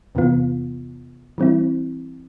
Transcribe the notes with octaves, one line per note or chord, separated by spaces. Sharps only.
E2 C3 E3 B3 F4
E3 G3 C4 E4